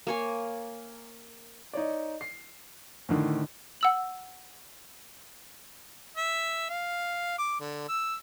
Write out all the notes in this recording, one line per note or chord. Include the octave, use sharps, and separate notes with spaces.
A#3 C#5 G#5
D#4 C#5 D5
C7
A2 D3 D#3
F#5 E6 F#7
E5
F5
D6
D3
E6